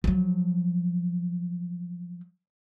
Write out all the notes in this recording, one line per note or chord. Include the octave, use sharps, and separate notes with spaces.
F3 F#3